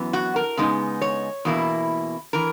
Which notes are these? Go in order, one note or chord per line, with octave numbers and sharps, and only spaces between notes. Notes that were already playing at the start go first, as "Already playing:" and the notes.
Already playing: F#2 E3 B3
F#4
A#4
C#3 G#3 B3 D#4
C#5
E2 B2 A#3 E4
E3 A#4